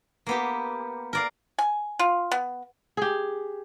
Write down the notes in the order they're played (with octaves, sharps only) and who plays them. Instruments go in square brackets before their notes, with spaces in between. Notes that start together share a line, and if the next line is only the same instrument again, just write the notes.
[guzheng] A#3 B3 G4
A#4 D5 F5
[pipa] G#5
F4
B3
[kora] G4 G#4